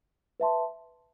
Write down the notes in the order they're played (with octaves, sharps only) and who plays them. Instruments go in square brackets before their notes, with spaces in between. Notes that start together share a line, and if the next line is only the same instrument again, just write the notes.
[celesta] B4 E5 A5 C6